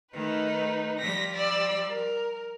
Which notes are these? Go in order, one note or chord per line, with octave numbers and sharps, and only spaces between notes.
D#3 A3 D#4 B4
F3 G3 A#6 B6
D5 E6
A#4